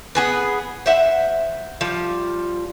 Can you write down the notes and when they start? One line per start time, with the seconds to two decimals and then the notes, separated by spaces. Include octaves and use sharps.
0.15 B3 G#4 B4
0.86 C5 E5 F#5
1.81 F3 G3